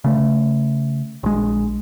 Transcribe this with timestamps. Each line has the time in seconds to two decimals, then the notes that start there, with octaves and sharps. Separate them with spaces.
0.04 C#3 A3
1.23 A#1 G#3